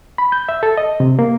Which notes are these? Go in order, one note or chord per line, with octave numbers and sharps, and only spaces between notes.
B5
G6
E5
A4
D#5
C3
A#3